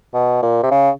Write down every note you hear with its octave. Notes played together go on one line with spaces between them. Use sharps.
B2
A#2
C3
C#3